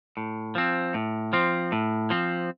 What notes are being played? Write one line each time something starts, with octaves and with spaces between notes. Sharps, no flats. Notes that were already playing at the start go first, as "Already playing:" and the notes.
A2
F3 C4
A2
F3 C4
A2
F3 C4